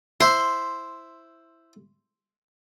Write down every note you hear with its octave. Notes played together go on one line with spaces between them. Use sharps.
E4 C5 E5 C6